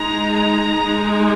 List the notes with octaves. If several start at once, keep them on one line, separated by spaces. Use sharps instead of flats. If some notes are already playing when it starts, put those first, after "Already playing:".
Already playing: G#3 D#4 A#5
A#5
G#3
D#4